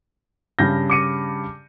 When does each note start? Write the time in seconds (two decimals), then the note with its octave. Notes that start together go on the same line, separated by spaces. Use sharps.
0.59 G2 C#3 G6 A#6
0.90 D6 C#7 D#7